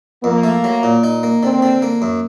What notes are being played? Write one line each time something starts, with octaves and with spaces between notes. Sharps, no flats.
F2 A#3
A3
F#3
A#2
D#4
A#3
D3 C4
D3
A#3
F#2